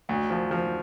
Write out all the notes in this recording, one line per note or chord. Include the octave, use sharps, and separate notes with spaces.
D2
F3
F3